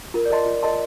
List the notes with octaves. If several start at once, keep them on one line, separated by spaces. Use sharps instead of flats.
F4 A#4
D5
A#4 D#5 A5 C6
F4
A#4 D#5 A5 C6